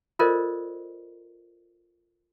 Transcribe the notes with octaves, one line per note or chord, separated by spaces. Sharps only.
F4 A4 A#4 C5 D5 D#5